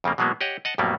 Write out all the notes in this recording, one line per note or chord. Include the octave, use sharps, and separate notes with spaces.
F2 C#3 G3 A#3
B2 E3 F#3 G#3 A#3 B3
G4 C#5 D#5 F#5
D#5 F#5 A5
F2 A2 F#3 G3 A#3 B3